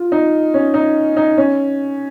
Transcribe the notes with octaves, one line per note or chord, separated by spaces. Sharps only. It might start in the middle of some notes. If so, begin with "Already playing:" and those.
Already playing: F4
D#4
C#4
D#4
D#4
C#4